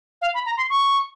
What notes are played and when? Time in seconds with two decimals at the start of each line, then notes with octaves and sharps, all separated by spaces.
0.21 F5
0.34 B5
0.46 A#5
0.57 C6
0.69 C#6